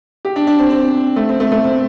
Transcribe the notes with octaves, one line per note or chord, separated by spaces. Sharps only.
G4
D4
D4
C4
C4
A3
C4
A3
A3
C4